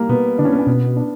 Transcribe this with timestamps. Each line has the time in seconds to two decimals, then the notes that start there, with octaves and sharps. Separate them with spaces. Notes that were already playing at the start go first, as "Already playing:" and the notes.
Already playing: G3 A#3
0.09 B2 B3
0.38 D3 D4
0.45 C#4
0.53 B3
0.59 C#4
0.67 B2 B3
0.96 D4